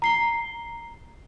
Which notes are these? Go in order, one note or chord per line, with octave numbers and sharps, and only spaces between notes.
A#5 C7 G7